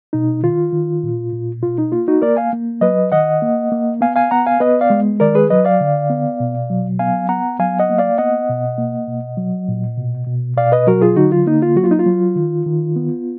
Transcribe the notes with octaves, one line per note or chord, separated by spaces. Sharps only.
B2 D#4
D#3 F4
D#3
A#2
A#2
B2 F4
D#4
A#3 F4
D#4 F#4
A#3 A#4 D5
F5 G#5
A#3
F#3 B4 D#5
D#3 D#5 F#5
A#3
A#3
B3 F5 G#5
F5 G#5
B3 F#5 A#5
F5 G#5
B3 B4 D#5
D5 F5
G#3
D#3 A#4 D5
G#4 B4
F#3 B4 D#5
D5 F5
D3
B3
B2
F#3
B3 F5 G#5
B3 F#5 A#5
F#3 F5 G#5
D#5 F#5
A#3
D5 F5
B3 D#5 F#5
B2
A#3
B2
F#3
A#2
B2
B2
B2 D5 F5
B4 D#5
F#3 F#4 A#4
F4 G#4
D3 D#4 F#4
F4
A#3 D#4
F4
F#3 F#4
F4
D#4
F4
F#3
D#3
D#3
B3